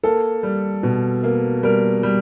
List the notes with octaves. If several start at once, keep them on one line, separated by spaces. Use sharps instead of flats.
A#3 A4
G3
B2
A#3
G3 A#4
G3